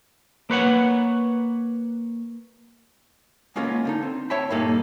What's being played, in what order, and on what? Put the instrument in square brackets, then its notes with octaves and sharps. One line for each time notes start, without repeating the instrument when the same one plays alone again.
[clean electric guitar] A#3 B4 C#5 F#5
[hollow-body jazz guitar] G#3 A#3 B3 C#4 F4 A#4
D3 D4 D#4
C4
C#5 E5 G5 A5 B5
G2 A#2 A#3 D#4 A4